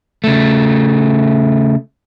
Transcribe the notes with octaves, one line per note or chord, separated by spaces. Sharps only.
C#3 A3